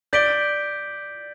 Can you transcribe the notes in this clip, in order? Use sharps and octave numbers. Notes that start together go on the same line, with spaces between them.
D5 G6 B6 D7 G7